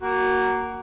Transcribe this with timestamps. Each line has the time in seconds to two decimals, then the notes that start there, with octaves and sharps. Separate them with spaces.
0.02 A#3 F#4